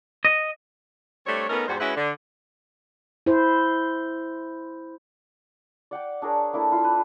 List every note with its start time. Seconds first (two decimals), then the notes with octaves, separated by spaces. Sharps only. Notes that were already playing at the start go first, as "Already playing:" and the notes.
0.25 D#5
1.27 G3 A3 C4 D4 C#5
1.49 A3 B3 C#4 D#4 A#4
1.68 E2 G#2 G3 F#4 G4 C5
1.80 G#3 C#4 E4 F#4 B4
1.96 D3
3.26 E4 C5
5.91 D5 F#5 G5 D6
6.22 D4 G#4 A#4 C#5
6.53 A#3 D4 E4 A4
6.72 E4 F4
6.84 B4